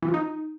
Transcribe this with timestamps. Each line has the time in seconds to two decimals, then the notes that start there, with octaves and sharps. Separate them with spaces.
0.02 E3
0.08 F3
0.14 D#4